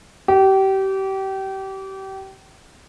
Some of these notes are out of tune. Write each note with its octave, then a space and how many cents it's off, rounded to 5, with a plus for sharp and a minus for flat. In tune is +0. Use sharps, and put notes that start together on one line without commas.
G4 -30